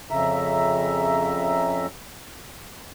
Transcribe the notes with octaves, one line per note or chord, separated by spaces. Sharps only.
F2 C#3 E5 A#5